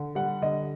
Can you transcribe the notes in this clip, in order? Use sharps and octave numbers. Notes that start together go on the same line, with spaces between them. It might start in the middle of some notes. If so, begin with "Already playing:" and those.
Already playing: D3
G3 F#5
D3 D#5